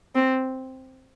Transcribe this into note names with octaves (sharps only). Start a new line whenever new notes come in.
C4